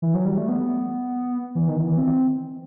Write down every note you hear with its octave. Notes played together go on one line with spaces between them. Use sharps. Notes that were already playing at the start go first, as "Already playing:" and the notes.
E3
F#3
G3
A3
B3
E3
D#3
E3
C4